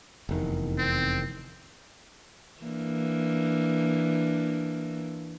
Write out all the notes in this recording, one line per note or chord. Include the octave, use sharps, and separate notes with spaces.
F1 E2 D#3
C4
E3 A#3 D4